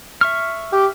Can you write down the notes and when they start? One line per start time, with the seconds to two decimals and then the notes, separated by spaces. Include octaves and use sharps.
0.21 E5 C#6 F6
0.73 G4